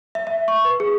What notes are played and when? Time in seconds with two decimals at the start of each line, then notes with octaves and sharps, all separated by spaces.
0.15 E5
0.27 E5
0.48 C#6
0.65 B4
0.80 G#4